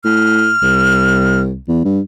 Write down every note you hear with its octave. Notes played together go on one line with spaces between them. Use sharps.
A2 F6
C2
E2
G2